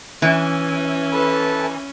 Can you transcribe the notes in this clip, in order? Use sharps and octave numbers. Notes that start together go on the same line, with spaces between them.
E3 C#4
A4 B4 A5